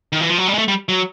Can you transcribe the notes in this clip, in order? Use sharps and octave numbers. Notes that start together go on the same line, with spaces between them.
D#3
E3
F3
F#3
G3
G#3
A3
G3
F#3